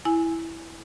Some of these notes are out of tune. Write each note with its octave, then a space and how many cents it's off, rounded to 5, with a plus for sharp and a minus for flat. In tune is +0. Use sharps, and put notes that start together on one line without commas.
E4 +0 G#5 +0